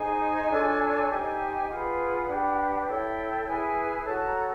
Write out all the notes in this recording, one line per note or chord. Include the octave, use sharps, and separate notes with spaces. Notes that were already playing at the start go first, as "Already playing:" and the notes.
Already playing: D#4 G#4 C5 G#5
D4 F4 A4 C#5
D#4 G4 C5 G#5
F4 G#4 B4 F#5
D4 G4 B4
E4 A4 C#5 G5
E4 G#4 B4 G#5
F#4 A4 C#5 A5
A#5